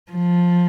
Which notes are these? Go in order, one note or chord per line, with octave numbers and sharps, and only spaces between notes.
F3